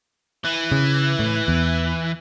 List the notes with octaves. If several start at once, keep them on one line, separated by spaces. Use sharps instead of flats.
E3
C#3
A2
E2